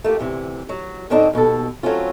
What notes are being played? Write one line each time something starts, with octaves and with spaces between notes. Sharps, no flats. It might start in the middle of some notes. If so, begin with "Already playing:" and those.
A3 A#3 F4 G4
D2 C3 E3
F#3
F#2 A2 D3 C4 D4 D#4
D#2 B2 G#4 A4
F#3 A3 C4 C#4 F4